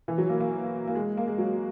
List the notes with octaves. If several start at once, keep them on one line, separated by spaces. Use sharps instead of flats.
E3
F#3
A#3
A#3
A#3
G#3
A#3
G#3
F#3